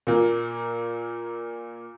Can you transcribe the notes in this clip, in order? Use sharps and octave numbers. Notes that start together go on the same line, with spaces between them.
A#2 A#3